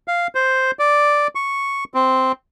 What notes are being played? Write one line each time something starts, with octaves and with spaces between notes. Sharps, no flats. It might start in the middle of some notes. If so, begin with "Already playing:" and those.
F5
C5
D5
C#6
C4